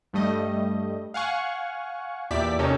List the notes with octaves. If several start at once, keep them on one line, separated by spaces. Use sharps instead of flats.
G2 G3 A3 D#5
F5 F#5 G#5 C#6
E2 A#2 G4 D5 E5 B6
C3 C#4 D#4 G4 A4 A#4